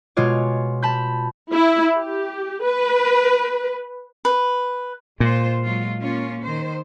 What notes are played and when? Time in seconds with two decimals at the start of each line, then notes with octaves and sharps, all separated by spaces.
0.17 B2 G#3 F4 C#5 D6
0.82 A5 B5 G6
1.51 E4
1.94 G4
2.62 B4
4.25 B4
5.20 A#2 G#3 F4 C5
5.64 F#3 G#3 F4
6.00 A#3 C#4 F4
6.42 D#3 C5